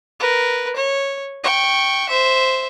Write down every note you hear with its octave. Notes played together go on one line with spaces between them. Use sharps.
A#4 B4
C#5
G5 C#6
C5 E5